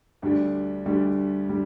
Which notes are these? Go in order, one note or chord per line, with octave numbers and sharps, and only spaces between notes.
D2 D3 G3 D4
D2 D3 G3 D4
D3 G3